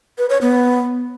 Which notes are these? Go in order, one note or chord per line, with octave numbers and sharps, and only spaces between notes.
B4
C#5
B3